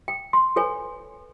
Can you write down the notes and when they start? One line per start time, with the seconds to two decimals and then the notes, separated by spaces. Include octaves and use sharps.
0.08 G5
0.33 C6
0.56 A4 B4 C#5 G#5